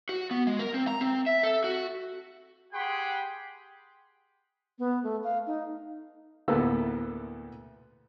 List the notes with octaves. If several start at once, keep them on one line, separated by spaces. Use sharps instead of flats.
F#4
B3
G#3
A#4
C4
A#5
C4
E5
A4
F#4
G4 G#4 F#5 G5 B5 C6
B3
A3
F5
D#4
D2 A2 A#3 B3 A4 E6